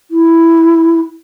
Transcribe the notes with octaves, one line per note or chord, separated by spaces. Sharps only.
E4